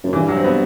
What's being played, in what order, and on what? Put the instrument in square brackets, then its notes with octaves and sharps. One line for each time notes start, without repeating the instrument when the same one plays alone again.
[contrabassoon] F#2
[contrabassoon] G2 [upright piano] E3
[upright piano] F#3
C4
B3